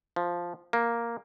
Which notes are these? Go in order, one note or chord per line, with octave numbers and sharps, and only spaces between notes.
F3
A#3